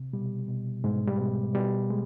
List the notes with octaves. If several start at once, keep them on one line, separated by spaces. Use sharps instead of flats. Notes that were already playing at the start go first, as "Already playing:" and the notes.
Already playing: C3
B2 G3
B2
G#2 B2 G#3
G3
B2
B2 G3
G#3